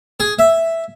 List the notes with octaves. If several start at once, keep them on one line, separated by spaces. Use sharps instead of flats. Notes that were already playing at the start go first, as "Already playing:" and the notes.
G#4
E5